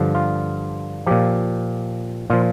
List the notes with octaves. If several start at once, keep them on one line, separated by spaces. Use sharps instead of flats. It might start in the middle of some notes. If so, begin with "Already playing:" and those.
Already playing: G2 D3 F3
F4
A#2 F3 G4
A#2 F3 F4